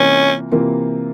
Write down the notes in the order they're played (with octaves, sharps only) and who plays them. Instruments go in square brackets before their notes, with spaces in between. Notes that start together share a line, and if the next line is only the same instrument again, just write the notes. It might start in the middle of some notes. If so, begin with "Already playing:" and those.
Already playing: [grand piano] C3 E3 A#3 F4 A#4 [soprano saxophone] C#4
[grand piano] C3 E3 A#3 F4 A#4